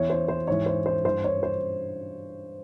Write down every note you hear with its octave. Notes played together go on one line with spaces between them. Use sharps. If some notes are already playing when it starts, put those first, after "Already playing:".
Already playing: E2 E3 C#5
C5
C5
G#2 E3 C#5
C5
C5
G2 E3 C5
C#5
C5